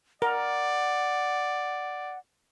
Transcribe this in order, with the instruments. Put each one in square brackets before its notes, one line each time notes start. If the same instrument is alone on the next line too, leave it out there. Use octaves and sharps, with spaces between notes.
[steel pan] A#4 [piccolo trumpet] D5 [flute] F#5